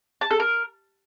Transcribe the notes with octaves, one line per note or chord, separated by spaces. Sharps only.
A5
A4
A#4